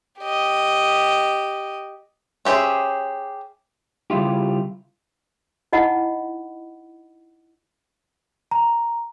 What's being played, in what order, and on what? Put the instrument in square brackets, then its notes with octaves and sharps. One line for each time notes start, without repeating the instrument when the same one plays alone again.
[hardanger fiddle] G4 D#5
[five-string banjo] C#4 G4 G#4 C5 E5
[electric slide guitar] C#3 G3 E4 F4 G4
[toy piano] D#4 E4 D#5 F#5 B5
[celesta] A#5